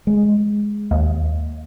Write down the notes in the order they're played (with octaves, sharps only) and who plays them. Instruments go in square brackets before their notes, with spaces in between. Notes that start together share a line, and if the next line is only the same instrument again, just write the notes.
[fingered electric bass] G#3
[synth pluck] D#2